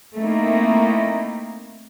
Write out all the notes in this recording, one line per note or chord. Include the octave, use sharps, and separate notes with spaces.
A3 A#3 C4 D#4 E4